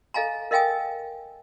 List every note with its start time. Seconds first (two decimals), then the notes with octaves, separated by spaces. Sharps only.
0.14 A4 D#5 F5 G#5 A#5
0.51 A#4 D#5 F5 G5 G#5 D#6